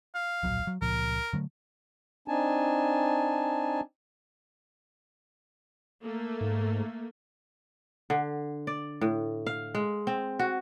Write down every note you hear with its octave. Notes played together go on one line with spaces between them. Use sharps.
F5
D1 A#1 F#3
F#3
C#2 A#2 F3 A#4
D3 F#3 A3
C4 D4 D#4 G#5 A5
A3 A#3
G#2
D3
D5
A2
F5
G#3
C4
F#4